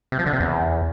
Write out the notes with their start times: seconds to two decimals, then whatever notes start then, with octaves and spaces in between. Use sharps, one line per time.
0.12 C3
0.19 F3
0.26 D3
0.33 C3
0.40 E2